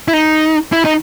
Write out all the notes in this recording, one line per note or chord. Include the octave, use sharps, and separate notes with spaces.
E4
D#4
E4
D#4